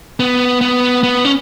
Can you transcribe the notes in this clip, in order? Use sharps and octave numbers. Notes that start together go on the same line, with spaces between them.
B3
B3
B3
C#4